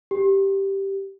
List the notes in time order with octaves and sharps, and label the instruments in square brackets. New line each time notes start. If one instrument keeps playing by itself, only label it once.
[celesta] G4